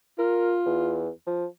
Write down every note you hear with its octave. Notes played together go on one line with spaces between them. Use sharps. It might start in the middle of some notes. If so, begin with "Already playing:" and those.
F4 A#4
E2
F3